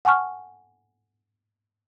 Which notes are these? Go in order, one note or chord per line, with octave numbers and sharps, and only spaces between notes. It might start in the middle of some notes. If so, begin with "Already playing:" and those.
F#5 G#5 A5 C#6 F6